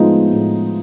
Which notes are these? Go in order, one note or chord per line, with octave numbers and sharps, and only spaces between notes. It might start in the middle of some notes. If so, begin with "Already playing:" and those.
Already playing: A2 F3 G#3 B3 D#4
A2